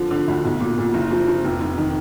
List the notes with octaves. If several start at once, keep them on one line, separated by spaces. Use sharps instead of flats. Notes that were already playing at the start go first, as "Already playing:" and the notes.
Already playing: D3 F3
D3
D2
B1
A#2
A#2
F#1
F3
F3
F1
F1
D#3